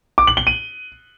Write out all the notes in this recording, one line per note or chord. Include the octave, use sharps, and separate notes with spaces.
D6
F#7
G7
D#7